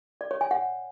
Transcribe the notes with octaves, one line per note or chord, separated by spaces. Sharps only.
D5
C#5
G#5
F#5